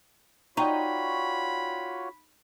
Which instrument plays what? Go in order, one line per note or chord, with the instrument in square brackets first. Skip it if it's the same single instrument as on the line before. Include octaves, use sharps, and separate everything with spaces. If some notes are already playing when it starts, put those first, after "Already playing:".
[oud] D#4 [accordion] F4 F#4 C#5 [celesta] D5 G5 C#6 [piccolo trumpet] B5